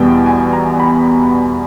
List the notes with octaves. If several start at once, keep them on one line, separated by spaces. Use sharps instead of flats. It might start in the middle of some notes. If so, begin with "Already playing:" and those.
Already playing: E2 B2 G3 B3 G5
G#5
A#5
B5